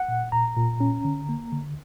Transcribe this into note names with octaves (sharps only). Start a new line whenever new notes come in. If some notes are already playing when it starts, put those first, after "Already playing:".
Already playing: F#5
A#2
A#2 A#5
A#2
C#4
D3
A#3
D3